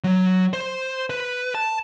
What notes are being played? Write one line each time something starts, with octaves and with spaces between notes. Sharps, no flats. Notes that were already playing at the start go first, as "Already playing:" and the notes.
F#3
C5
B4
A5